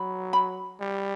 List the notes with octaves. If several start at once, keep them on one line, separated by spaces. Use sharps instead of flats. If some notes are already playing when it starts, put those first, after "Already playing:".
Already playing: F#3 B5
B5
G3